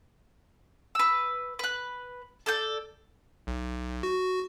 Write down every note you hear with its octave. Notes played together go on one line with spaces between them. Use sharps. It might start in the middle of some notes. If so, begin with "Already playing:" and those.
B4 E6
B4 F#6
A4 D5 G6
B1
F#4